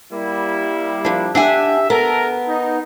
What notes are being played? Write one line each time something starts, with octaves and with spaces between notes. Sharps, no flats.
G3 A#3 E4
F3 D4
D4 G4 E5 F#5 G#5
B3 A4 A#4
D#4